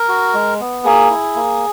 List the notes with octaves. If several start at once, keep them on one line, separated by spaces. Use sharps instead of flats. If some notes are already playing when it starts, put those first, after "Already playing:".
Already playing: A#4
F#4
G#3
B3
A#3 G#4
E4
A#3